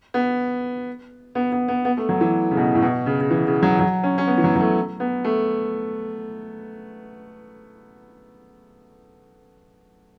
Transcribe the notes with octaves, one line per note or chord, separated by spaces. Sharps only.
B3
B3
B3
B3
B3
A3
F#3
E3
C#3
B2
A2
B2
C#3
C#3
E3
C#3
F#3
F#3
C#4
C#4
B3
E3
F#3
F#3
A3
B3
A3